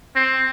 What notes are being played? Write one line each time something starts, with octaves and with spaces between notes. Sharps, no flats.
C4